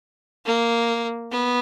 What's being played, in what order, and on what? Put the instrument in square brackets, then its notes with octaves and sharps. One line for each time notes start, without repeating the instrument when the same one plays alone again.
[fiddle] A#3
B3